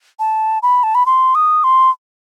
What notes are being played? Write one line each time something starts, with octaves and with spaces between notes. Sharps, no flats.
A5
B5
A5
B5
C6
D#6
C6